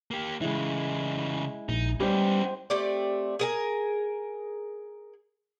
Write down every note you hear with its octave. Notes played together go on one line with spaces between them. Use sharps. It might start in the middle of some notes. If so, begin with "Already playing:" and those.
A#3 G4
C#3 E3 G#3 E4
A#1 D#4
G3 B3 C#4 G4 C5
A3 C4 G4 D5
G#4 A#4 G#5